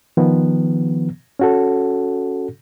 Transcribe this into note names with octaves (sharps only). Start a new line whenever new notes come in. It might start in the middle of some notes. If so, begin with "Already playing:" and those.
D#3 F3 B3
C#4 F#4 A4